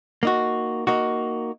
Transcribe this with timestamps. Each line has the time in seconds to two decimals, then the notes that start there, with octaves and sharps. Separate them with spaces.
0.23 A#3 D#4 F#4
0.87 A#3 D#4 F#4